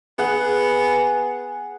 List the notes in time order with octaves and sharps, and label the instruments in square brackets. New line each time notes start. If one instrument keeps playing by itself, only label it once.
[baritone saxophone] B3 [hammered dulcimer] G#4 F#5